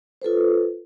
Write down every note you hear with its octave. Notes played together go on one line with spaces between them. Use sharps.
F4 A4 B4 C5